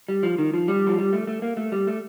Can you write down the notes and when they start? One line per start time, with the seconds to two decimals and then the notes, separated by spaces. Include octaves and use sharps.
0.08 G3
0.23 F3
0.38 D#3
0.54 F3
0.68 G3
0.87 F3
0.98 G3
1.13 A3
1.27 A3
1.42 A#3
1.57 A3
1.72 G3
1.87 A3